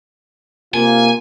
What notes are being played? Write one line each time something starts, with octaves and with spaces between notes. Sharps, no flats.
C3 A#3 F4 G#5